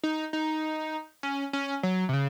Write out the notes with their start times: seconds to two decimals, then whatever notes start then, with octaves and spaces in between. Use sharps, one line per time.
0.03 D#4
0.33 D#4
1.23 C#4
1.53 C#4
1.83 F#3
2.09 C3
2.13 C#3